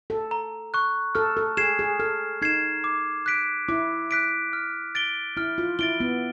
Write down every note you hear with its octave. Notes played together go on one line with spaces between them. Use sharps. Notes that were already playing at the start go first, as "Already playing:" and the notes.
A4
A#5
C#6 F#6
A4 F6
A4
G#4 G#6 C7 E7
G#4
A4 F6
D#4 G#6 C7 E7
D6
F#6 B6 D7
E4 D6
F#6 B6 D7
F6
A6 D7 G7
E4 F6
F4
E4 A6 D7 G7
B3